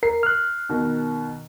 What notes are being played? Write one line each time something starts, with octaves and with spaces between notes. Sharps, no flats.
A#4 C7
F6 F#6
B2 D#3